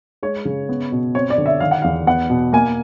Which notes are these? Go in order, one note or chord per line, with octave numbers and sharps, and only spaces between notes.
G#3 C#5
C#3
B3
B2
C4 C#5
D5
D3
E5
D#3 F5
F#5
E2 F5
B3 F#5
B2
A#3 G#5